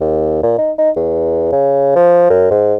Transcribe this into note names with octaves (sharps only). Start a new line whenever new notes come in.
D#2
A#2
D#4
D#4
E2
C#3
F3
F#2
G#2